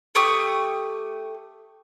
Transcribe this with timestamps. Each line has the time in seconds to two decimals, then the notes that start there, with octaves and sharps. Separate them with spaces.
0.15 A3 G4 C#6 D#6